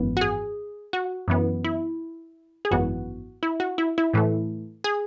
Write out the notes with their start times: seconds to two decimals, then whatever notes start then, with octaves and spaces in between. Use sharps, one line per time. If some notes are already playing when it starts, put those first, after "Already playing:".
Already playing: G#1 F#2 E3 B3
0.17 F#4
0.21 G#4
0.93 F#4
1.28 F#2 E3 B3
1.65 E4
2.65 G#4
2.71 G#1 F#2 E3 B3 F#4
3.43 E4
3.60 F#4
3.78 E4
3.98 E4
4.14 A2 E3 A3
4.84 G#4